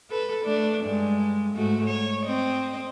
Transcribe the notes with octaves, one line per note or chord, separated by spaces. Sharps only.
A4 B4
A3 D4
G2 G#3
G#2 A3 F#4
C#5
C4 D#5